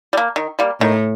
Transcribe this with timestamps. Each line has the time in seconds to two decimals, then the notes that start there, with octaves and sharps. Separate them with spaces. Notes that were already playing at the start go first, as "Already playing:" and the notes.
0.13 G3
0.17 A#3
0.36 D#3
0.59 G3 A#3
0.80 A2 D#3